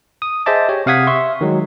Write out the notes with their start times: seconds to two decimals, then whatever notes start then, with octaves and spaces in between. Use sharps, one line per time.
0.22 D#6
0.46 G#4 C5 D#5 E5 A5 D6
0.69 G4 C#5
0.86 C3 F5 F#5 D#6 G#6 B6
1.07 E5 C6 C#6
1.41 D#3 F#3 G#3